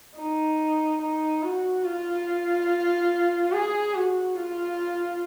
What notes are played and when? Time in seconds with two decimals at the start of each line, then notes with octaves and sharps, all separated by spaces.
0.18 D#4
1.02 D#4
1.43 F#4
1.85 F4
3.52 G#4
3.94 F#4
4.36 F4